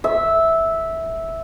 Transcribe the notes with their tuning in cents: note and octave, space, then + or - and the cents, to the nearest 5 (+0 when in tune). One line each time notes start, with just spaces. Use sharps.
E5 -10